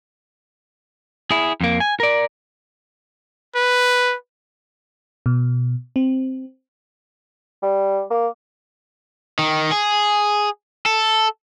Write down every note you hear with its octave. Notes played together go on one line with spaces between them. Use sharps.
E4 G#4
F2 A#3
G#5
A#4 D5
B4
B2
C4
G3
A#3
D#3
G#4
A4